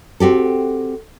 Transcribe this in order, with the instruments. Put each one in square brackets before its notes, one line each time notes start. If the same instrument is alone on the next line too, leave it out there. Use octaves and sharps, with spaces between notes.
[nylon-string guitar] C4 F#4 G4 A4